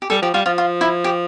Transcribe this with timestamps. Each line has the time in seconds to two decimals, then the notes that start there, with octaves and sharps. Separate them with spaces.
0.02 G4
0.10 G3 A4
0.22 F3 G4
0.34 G3 F4
0.46 F3 F4
0.58 F4
0.81 E4
1.04 G4